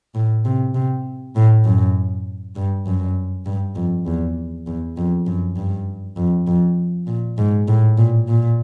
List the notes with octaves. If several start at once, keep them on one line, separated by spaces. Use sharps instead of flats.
A2
C3
C3
A2
F#2
G2
F#2
G2
F2
E2
E2
F2
F#2
G2
F2
F2
A#2
G#2
A2
A#2
A#2